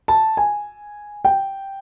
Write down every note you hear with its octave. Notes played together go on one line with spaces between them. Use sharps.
A5
G#5
G5